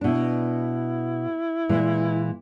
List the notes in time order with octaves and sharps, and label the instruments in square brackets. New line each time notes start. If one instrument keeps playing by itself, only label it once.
[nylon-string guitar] B2 D4 [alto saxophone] E4
[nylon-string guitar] A#2 E3 G#3